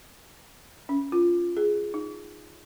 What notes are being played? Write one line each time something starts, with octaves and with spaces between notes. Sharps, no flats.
C#4
F4
G#4
D#4